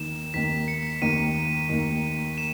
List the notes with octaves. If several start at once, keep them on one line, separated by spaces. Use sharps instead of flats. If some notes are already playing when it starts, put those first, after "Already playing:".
Already playing: D#2 D#3 A#3 E7
D#2 D#3 A#3 B6
C#7
D#2 D#3 A#3 D#7
D#2 D#3 A#3
E7